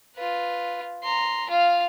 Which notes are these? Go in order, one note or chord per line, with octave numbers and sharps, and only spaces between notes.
F4 B4
A#5 C6
F4 F5